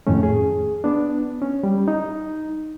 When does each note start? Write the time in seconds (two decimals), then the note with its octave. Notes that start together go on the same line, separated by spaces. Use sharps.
0.07 F2 A2 D#3 A3 C#4
0.23 G#4
0.84 B3 D4
1.42 C#4
1.63 G3
1.88 D#4